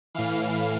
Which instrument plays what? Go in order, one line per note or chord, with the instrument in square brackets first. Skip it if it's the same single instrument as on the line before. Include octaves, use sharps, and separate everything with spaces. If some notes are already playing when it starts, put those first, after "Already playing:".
[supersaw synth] A2 E3 F5